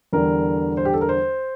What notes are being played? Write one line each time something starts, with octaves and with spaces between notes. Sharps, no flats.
E2 D3 G3 A#4
C5
G4
A4
A#4
C5